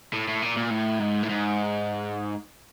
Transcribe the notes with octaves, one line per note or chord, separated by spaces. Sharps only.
A2
A2
A#2
A#2
A2
G#2
A2
G#2